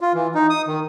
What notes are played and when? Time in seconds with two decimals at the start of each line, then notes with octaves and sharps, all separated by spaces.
0.01 F4
0.14 E3
0.35 D#4
0.50 D#6
0.68 D#3